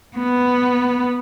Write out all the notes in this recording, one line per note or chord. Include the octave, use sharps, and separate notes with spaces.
B3